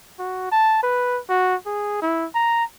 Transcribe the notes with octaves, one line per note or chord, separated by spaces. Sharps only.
F#4
A5
B4
F#4
G#4
E4
A#5